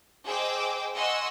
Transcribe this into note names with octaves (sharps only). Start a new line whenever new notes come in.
G#4 C5 D#5 G5 D6 E6
D#5 F#5 G#5 C6 C#6 E6